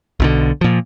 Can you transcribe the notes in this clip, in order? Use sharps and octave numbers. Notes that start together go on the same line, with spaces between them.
B1 B2 D3
A#2 F3